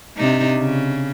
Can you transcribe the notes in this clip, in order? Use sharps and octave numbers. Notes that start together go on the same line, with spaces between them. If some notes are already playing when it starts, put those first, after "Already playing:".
C3 D4 D#4
C#3